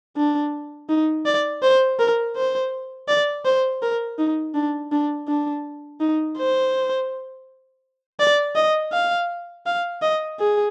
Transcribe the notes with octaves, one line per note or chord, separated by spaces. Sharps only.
D4
D#4
D5
C5
A#4
C5
D5
C5
A#4
D#4
D4
D4
D4
D#4
C5
D5
D#5
F5
F5
D#5
G#4